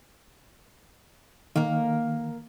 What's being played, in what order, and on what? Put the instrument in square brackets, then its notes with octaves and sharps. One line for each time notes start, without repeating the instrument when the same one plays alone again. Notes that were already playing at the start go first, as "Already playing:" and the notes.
[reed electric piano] D#3 [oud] A#3 A#4